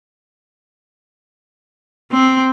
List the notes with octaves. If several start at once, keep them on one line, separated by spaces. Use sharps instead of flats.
C4